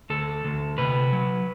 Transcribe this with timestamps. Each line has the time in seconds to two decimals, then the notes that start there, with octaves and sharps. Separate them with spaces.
0.10 D2 A4
0.45 D2
0.78 C3 B4
1.12 F#3